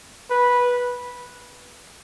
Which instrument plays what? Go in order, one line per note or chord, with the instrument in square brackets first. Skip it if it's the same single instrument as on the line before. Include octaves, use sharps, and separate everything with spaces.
[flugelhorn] B4